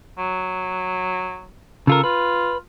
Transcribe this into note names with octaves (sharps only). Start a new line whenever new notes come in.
F#3
C#3 F4 A4 A#4
F4 B4